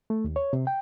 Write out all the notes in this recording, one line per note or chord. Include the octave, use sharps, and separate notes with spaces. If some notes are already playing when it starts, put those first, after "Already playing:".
A3
D#2
C#5
C3
G5